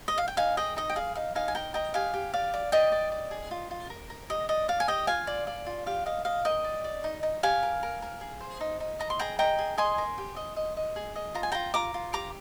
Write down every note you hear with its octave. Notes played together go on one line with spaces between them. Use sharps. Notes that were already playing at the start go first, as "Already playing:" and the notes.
D#5
F5
G5
D#4 F5 G#5
G#4 D#5 G5
D#4 D#5
G5
G#4 F5
D#4 F5
D#4 F5 G#5
G#5
A#4 G5 A#5
D#5 G5 A#5
G4 F5 G#5
G4
D5 F5
D5
D5 D#5 G5
D5
D5
G#4
F4
F4
A#4
A#4
G4 D#5
D5 D#5
D5 F5
G#5
G4 D#5 G5
F4 F5 G#5
D5
D5
F4
G4 F5
D#5 F5
D#5 F5
A#4 D#5 G5
D5
D5
D#4
D#4
G4 F5 G#5
A#4
A#4
A#4
G#4
C5
D#4
D#4
D#5 A#5
C6
G#4 G5 A#5
D#5 G5 A#5
G#4
D#5 G#5 C6
A#4
G4
D#5
D#5
D#5
G#4
D#5
F4 A#5
G#5
F4 G5 A#5
F4 A#5 D6
F4
G4 A#5 D6